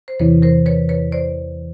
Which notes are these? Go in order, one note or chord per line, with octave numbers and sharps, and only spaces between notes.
C5
E2 C3 E3 B4 C#5
A#4 C5
B4 C#5
B4 C#5
C5 D5